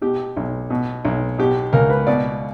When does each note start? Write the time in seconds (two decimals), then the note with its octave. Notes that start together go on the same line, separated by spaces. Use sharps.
0.02 B2 G4
0.37 B1
0.70 B2
1.05 B1
1.38 B2 G4
1.73 C#2 A#4
1.90 B4
2.07 B2 D5